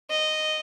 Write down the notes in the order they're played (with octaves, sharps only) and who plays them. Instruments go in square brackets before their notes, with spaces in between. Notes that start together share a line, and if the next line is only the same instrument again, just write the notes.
[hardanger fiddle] D#5